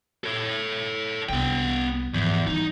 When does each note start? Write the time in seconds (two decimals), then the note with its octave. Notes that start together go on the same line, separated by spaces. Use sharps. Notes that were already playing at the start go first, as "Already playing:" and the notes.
0.24 A4 C#5
1.29 C2 B3 G5
2.14 E2 G#2 F3
2.47 G3 D#4